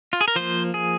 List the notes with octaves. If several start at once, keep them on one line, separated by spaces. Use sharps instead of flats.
F4
G#4
A#4
F3 A#3 C5
G#4